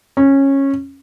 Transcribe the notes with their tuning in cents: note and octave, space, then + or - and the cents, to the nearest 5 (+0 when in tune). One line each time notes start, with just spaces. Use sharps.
C#4 -15